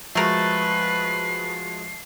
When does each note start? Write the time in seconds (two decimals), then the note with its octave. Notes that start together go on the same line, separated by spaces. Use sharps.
0.15 F3 G#3 A3 F#4 A#4 B4 C7